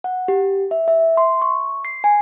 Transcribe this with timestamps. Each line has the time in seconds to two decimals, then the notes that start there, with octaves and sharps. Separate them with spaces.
0.04 F#5
0.28 G4
0.71 E5
0.88 E5
1.17 C6
1.42 C#6
1.85 C7
2.04 G#5